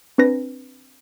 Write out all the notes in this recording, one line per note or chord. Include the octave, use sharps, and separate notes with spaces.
C4 D4 B4 A#6